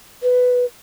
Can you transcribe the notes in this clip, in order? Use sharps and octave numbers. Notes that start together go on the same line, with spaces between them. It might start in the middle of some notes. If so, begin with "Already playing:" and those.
B4